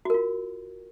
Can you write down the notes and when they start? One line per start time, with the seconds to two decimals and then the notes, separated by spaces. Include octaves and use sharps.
0.05 F#4
0.10 A#4
0.14 F4